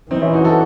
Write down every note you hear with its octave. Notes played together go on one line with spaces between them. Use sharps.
E3 C4 D#4
C#4 E4
D#4 F#4
F#4 A4